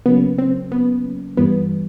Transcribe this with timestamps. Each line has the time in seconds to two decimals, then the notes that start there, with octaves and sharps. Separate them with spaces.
0.06 C#3 F#3 A#3 B3 C#4
0.38 C4
0.72 B3
1.37 G2 E3 G3 B3